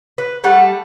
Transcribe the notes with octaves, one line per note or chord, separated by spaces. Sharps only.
B4
G3 A3 F#5